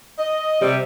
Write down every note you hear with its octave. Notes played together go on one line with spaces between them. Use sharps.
D#5
C3 G3